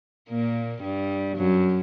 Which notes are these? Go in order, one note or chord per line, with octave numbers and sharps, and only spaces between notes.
A#2 A#3
G2 G3
F#2 F#3